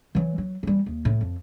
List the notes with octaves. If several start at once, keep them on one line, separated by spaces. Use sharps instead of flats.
E3 F#3
F#3
E3 G3
D#2
A2
F2